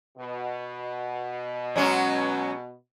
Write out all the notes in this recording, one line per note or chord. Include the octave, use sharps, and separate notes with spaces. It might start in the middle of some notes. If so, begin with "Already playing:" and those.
B2
F#3 G#3 C#4